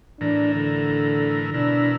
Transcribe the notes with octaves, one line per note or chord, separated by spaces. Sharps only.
A2 E3 D4 A#4
D3
B2 D4 E4 A#4